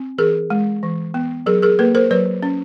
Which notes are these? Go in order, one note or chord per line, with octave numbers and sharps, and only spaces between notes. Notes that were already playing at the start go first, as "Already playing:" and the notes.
Already playing: C4
E3 G#4 A#4
G#3
E3
B3
F#3 G#4 A#4
G#4 A#4
A#3 A4 B4
A#4 C5
F#3 B4 C#5
C#4